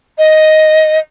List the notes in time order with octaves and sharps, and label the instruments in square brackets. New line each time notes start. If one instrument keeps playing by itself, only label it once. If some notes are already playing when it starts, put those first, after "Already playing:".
[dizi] D#5